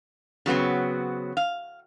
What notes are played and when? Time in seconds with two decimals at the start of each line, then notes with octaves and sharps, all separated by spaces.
0.46 C#3 F#3 B3 C4
1.37 F5